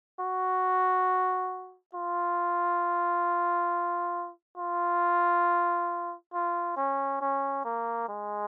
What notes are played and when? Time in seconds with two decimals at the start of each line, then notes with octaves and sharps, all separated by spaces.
0.20 F#4
1.94 F4
4.57 F4
6.34 F4
6.77 C#4
7.21 C#4
7.65 A#3
8.09 G#3